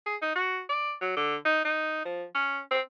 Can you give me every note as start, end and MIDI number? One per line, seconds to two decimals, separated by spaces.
0.06 0.16 68
0.22 0.33 63
0.36 0.60 66
0.69 0.93 74
1.01 1.12 54
1.17 1.36 50
1.45 1.63 63
1.65 2.01 63
2.05 2.24 53
2.35 2.60 61
2.71 2.81 60